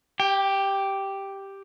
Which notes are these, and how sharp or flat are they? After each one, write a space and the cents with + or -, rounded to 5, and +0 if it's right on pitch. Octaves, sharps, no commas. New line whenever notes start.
G4 +0 G5 +30